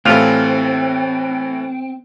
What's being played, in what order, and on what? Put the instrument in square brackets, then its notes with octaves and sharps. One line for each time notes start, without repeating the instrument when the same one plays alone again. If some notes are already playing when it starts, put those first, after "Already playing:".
[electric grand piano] A2 E3 A4 [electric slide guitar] C4 [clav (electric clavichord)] F4 G4 F5 [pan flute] G5